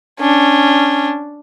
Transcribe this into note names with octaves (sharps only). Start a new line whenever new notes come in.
C#4 D4